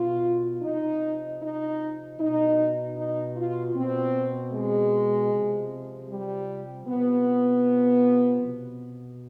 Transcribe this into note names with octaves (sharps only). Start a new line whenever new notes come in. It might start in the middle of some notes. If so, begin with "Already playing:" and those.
Already playing: B2 F4
C3 F3 D#4
D#4
B2 D#4
D#4
F4
B2 C4
G#3
C3 F3
G3
C3 F3 B3
B2